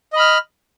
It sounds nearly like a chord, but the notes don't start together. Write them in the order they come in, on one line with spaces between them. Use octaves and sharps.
D#5 B5 F6